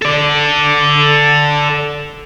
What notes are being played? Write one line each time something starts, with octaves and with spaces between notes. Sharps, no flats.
A4 D5